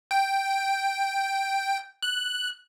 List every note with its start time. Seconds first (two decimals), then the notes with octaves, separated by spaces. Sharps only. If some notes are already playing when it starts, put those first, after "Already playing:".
0.11 G5
2.02 F#6